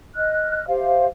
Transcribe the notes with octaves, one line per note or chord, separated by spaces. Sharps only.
D#5 F6 F#6
G4 C5 E5 F5